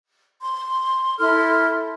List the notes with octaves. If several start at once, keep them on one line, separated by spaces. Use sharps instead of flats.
C6
E4 A4 C6 F6